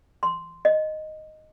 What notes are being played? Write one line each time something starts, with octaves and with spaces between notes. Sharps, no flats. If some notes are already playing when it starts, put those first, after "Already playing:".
C6
D#5